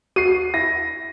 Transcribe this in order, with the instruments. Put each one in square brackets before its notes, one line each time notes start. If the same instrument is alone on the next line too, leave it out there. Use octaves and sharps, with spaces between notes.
[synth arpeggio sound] F#4 [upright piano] C7 D#7
[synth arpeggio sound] E4 [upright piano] A#6